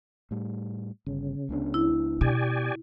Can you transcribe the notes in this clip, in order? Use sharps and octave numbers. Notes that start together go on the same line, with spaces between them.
A2 G3
G1 C#3
C#2 B3 D4
E4
B2 G4 D5 G#5